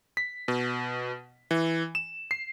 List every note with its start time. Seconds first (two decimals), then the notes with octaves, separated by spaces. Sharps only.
0.17 B6
0.48 B2
1.51 E3
1.95 E7
2.31 C7